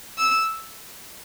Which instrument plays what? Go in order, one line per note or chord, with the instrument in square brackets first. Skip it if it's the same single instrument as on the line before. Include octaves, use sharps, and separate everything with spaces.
[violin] E6